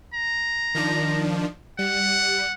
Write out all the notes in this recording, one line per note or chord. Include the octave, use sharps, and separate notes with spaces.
A#5
D#3 F3 D4
G3 F#5